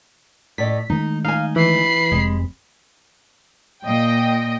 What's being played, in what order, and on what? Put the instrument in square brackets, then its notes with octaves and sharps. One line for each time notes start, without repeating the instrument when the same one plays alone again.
[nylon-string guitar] A2 D5 D#5 [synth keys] B6
[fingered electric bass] D#3 G#3 A3 [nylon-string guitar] D#4
[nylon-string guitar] D#4 G#5 [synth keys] F5
[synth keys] E3 [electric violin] B5 C7
[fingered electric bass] F1 C3 [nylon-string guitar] G#3
[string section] A#2 D#5 G5